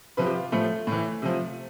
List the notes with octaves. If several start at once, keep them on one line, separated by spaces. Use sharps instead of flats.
C3 F3 B4
G4
F4
A2 F3 A3
A2 E3
C3 F3